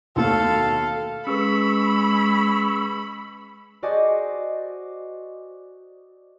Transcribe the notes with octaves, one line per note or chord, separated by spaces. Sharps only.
D#2 B2 A3 A4 F5
G#3 C#4 G#4 B4 B5 C#6 E6
F#4 C5 D5 D#5 G#5